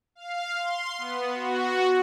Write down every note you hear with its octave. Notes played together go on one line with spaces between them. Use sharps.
F5
C6
B3
F#4